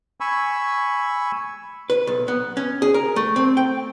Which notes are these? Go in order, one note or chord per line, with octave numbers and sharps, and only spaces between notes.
G#5 B5 C#6 E6
B4
B1
B3
C#4
G#4
A#4
A3
C4
G5